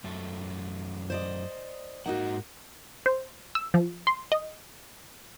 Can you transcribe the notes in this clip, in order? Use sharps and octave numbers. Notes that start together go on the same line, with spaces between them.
F#2 A3 A4
C5 D5 D#5
G#2 A#3 D#4 F#4 F#5
C5
E6
F3
C6
D#5